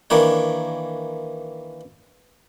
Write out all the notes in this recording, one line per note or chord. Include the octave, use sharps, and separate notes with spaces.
D#3 E3 A#3 D4 C#5